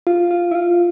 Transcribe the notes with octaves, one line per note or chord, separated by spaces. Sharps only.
F4
F4
E4
F4